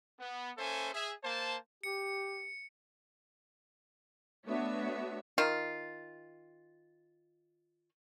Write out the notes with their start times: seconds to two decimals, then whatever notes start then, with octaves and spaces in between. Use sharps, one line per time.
0.18 B3
0.57 A#3 C#4 A4 C5 E5 G#5
0.93 G#4 E5
1.23 A#3 C5 A5
1.83 G4 C#7
4.46 A3 B3 D4 F#4 C#5 E5
5.38 D#3 F4